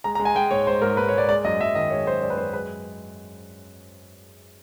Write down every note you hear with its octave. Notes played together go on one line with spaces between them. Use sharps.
G#3 A#5
A#5
G#3
G#5
G#3 G5
G#2 C#5
G#3 C5
G#2 A#4
G#2 B4
C#5
G#3 D5
G#3 D5
F#2 D#5
F#2 E5
D#3 D#5
G#3 C#5
F#2 C5
G#3 D5
B4
F#2 C5
G#3 B4